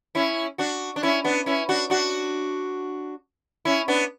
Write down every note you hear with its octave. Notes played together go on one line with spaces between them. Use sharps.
C#4 E4
D4 F#4
D4
C#4 E4
B3 D4
C#4 E4
D4 F#4
D4 F#4
C#4 E4
B3 D4